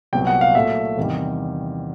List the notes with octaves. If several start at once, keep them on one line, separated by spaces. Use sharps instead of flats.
C2 A#2 F#3 B3 G5
F#5
F5
A#2 F#3 A3 E5
E2 C3 D#3 G3